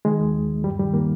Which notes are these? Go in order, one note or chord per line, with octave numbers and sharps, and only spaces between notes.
D#3 G#3
D#2
D#2
D#2
G2 G3
D#3 G3
D#3 A#3